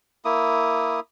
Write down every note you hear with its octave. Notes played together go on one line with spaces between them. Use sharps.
A#3 E4 D#6